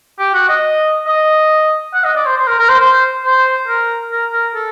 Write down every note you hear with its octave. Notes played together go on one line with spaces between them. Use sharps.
G4
F#4
D#5
D#5
F#5
D#5
D5
C5
C5
A#4
A#4
C5
C5
C5
A#4
A#4
A#4
A4